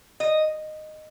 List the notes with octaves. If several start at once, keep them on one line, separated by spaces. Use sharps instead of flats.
D#5